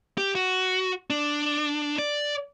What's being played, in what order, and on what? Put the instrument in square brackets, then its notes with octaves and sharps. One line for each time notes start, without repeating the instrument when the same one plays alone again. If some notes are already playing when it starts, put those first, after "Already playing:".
[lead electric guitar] G4
F#4
D4
D5